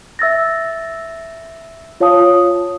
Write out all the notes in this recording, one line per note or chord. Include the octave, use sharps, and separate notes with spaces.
E5 E6 A6 A#6
F4 C#5 F5 A5 D#6